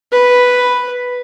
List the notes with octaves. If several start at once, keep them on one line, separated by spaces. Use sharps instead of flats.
B4